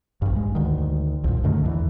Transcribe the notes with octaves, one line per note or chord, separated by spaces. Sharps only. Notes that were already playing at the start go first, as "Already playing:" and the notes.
A#1 G2
G#3
D2 D#3
C2 F2 A#2
F#2 D3 D#3 A3
E2 E3